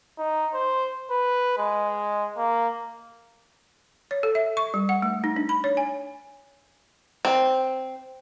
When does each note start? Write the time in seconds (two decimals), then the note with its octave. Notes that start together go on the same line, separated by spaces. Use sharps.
0.18 D#4
0.54 C5
1.11 B4
1.58 G#3
2.38 A#3
4.11 C#5
4.23 A4
4.35 E5
4.57 C#6
4.74 G3
4.89 F#5
5.02 A3
5.24 D#4
5.36 D4
5.49 B5
5.64 C#5
5.77 G#5
7.25 C4